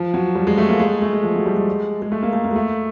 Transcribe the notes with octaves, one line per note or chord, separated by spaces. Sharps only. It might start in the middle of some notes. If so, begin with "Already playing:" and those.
Already playing: F3
F#3
G3
G#3
A3
A#3
G#3
A3
G#3
F3
F#3
G3
G#3
G#3
A3
A#3
A3
A#3
G#3
A3